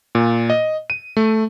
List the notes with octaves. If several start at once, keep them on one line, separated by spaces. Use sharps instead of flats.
A#2
D#5
D#7
A3